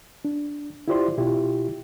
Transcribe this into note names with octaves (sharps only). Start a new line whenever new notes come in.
D4
E4 F4 G4 C5 D5 C6
B2 E4 F4 G4